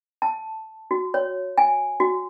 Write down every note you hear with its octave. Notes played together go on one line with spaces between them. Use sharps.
A5
F#4
C#5
G#5
F#4